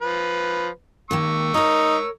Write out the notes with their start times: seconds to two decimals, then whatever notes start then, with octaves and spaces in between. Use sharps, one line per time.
0.02 F3 B4
1.11 D#2 D#3 A#3 C#6 E6
1.54 D#4 A#4 C#5